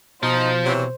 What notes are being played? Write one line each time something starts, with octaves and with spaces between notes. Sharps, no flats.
B2 F3 D#4 C5
C3 E3 F#3